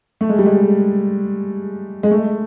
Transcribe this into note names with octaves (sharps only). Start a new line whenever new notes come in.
A3
G#3
G3
G#3
G#3
A3